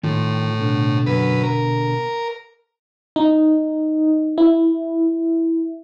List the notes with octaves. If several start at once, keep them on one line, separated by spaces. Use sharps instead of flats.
A2 D#3 F4
B2 D3
F#2 B4
A#4
D#4
E4